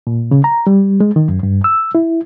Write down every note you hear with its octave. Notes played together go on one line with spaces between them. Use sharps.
A#2
C#3
A#5
G3
G#3
D#3
F#2
G2
E6
E4